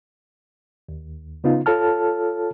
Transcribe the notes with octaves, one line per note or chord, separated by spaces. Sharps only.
D#2
C#3 B3 D#4 F4
F4 A4 C#5 A5 F6